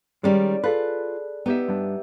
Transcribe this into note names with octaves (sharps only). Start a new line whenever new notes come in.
D#3 G3 G#3 C#4 D5
F4 G#4 A4 B4 F#6
B3 D#4 G4 E5
G2 D4